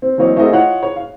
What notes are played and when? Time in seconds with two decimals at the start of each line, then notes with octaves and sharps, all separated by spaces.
0.02 C4
0.18 E3 F#3 A#3 C4 C#5 D#5
0.36 A3 C4 F#4 G#4 A#4 D#5
0.53 F4 C#5 D#5 F#5
0.83 C#5
0.96 F5